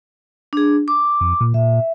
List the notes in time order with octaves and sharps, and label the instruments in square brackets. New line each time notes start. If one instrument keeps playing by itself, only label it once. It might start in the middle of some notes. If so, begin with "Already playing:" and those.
[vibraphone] D4 G#4
D6
[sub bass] F2
A#2
[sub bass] A#2 [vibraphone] E5